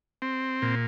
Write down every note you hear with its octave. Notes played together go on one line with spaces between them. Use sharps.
C4
A#2